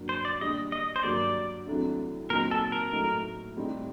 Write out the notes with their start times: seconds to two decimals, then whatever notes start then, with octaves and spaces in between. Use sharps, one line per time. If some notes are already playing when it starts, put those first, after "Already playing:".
Already playing: G2 F#3 A#3
0.09 C5
0.25 D5
0.41 A#2 G3 D4 D#5
0.72 D#5
0.96 C5
1.03 G2 F#3 A#3 D4 D5
1.67 C2 C3 F#3 A3 D4
2.30 A#2 F#3 C4 D#4 A#4
2.51 A4
2.72 A#4
2.93 A2 F#3 A3 D#4
3.57 A2 G3 C4 D#4